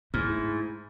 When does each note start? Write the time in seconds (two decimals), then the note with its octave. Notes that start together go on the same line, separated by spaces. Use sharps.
0.14 G#2 A3 E4 F6